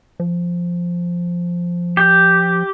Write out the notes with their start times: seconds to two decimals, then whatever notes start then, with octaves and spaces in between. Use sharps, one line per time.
0.20 F3
1.97 G4